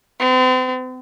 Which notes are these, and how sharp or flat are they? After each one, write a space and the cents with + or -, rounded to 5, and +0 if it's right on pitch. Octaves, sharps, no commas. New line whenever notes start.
C4 -40